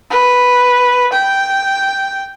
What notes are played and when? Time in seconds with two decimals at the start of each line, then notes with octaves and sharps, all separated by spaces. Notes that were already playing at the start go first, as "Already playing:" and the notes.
0.11 B4
1.12 G5